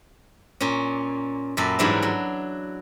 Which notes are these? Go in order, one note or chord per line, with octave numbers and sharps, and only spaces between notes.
A#2 C#4
F#2 A#2 A4 B5
G#2 E3 F#3 G3 D4 E4
F#3